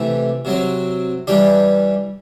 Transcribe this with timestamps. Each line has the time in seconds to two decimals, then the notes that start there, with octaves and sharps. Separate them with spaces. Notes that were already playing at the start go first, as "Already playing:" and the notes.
Already playing: C3 E3 A3 E4 G4
0.45 C3 F#3 C4
1.27 E3 G3 D4 G4